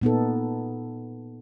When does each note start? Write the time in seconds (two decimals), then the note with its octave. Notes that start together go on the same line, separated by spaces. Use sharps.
0.02 A#2 B3 D#4 A4